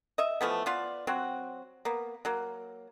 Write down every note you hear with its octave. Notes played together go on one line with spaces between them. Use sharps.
D#5 E5
E3 F3 A3 B3
B3 F4 D5
F#3 C4 F#4
A#3 B3
F#3 A#3